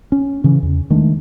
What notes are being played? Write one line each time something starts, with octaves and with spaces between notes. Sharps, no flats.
C#4
C#3 E3 C#4
E2
D#3 G#3 A3 D4